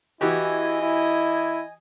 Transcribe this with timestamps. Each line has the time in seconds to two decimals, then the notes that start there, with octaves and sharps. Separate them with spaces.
0.21 E3 E4 F#4 G4 D#5 G#5
0.82 E4